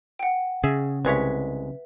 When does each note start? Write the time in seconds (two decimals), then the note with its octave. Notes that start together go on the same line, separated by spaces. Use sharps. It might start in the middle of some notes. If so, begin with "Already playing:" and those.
0.19 F#5 G5
0.64 C#3 G#4 E5
1.05 C2 G#3 B4 C#5 E5 B6